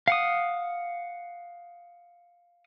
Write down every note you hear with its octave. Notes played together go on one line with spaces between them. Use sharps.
F5 F#5 D#6